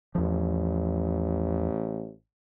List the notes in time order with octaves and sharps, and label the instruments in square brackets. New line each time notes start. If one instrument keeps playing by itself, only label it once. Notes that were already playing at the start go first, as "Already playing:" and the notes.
[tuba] A1 [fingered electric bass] E2 F3